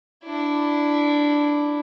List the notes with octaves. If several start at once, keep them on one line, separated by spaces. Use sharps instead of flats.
D4 E4